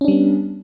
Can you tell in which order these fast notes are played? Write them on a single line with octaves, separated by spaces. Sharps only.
C#4 D4 G3 B3